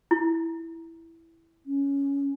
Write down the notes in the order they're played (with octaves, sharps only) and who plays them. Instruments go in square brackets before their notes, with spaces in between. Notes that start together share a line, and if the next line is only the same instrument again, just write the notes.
[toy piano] E4
[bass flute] C#4